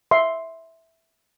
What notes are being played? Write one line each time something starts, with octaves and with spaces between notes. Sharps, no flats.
E5 C6